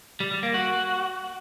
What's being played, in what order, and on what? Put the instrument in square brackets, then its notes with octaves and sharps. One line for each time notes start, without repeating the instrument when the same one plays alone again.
[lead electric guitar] G3
G3
A#3
F#4